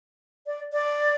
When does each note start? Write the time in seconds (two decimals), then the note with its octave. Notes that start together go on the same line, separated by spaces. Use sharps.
0.47 D5
0.73 D5